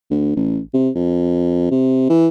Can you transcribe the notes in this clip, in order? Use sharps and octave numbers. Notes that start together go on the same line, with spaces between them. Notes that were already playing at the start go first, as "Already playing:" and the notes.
D2
A1
C3
F2
C3
E3